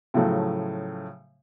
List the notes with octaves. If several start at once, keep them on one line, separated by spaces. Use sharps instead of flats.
A2 C#3 F3 F#3 A3